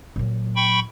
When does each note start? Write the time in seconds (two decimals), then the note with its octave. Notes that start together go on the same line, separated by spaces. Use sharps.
0.16 A#2 F#3
0.56 G5 B5 C#6